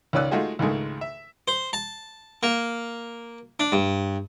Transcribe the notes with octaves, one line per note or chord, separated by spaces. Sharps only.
C#2 D#3 C#4 D5 E6 F#6
G#3 A3 D#4 F4 F#4 G#4
C#2 G#2 D#3 G#3 A3
E5
C5
A5
A#3
D4
G2